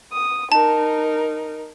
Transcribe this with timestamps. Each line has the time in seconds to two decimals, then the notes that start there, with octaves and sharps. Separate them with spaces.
0.12 D#6
0.52 D#4 A#4 A5